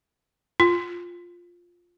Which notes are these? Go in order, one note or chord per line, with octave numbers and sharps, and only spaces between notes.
F4